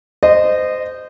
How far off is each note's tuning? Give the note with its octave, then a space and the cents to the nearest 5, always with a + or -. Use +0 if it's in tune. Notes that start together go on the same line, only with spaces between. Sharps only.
C5 -20 D#5 -20